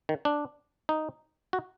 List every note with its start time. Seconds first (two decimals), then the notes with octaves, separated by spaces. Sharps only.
0.09 D#3
0.25 D4
0.89 D#4
1.53 F#4